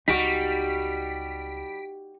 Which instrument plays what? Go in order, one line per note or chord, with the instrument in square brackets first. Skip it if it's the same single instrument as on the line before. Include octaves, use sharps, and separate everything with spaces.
[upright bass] C#2 [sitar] G3 [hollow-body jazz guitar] D#4 F#4 [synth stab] B6 D7